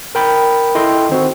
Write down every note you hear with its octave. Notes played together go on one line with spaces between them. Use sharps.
A#4 G5 B5
E4 A4 D#5 G5 C6
D#3 C4 F#4